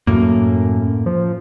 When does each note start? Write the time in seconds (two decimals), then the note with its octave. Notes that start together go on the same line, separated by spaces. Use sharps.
0.07 F#2 A2 A#3
1.06 F3